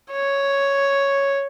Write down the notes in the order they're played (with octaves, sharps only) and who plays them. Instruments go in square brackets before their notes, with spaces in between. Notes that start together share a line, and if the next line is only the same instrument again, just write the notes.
[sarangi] C#5